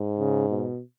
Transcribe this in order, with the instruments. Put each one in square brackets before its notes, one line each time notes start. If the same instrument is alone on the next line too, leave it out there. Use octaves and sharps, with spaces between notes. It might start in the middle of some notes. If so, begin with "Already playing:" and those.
Already playing: [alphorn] G#2
[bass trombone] C#3
B2